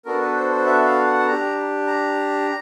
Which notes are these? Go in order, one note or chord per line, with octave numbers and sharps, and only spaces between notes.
B3 D4 F#4 A4 A#4
B4
C5
C5
E5
F5
F#5
A5
D4 G4 A#5
A#5